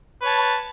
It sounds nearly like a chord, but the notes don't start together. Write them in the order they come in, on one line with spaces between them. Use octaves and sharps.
B4 C#5 A5